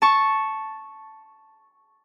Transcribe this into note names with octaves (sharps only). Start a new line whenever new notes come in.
A5 C#6